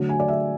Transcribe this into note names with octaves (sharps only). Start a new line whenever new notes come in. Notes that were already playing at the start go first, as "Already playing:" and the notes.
Already playing: D3 F#3 A3
G#5
D5
E5